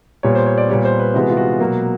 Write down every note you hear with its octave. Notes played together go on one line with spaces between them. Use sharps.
A#2 G3 B3 C#5
C5
C#5
D5
A#2 G3 B3 C#5
C5
B4
C3 E3 G#3 B3 F#4
F4
F#4
B2 F#3 A#3